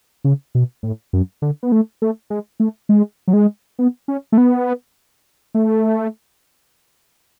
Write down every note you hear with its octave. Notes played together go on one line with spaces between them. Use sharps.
C#3
B2
A2
F#2
D3
B3
A3
A3
G#3
A3
G#3
F#3
G#3
B3
C#4
A3
B3
A3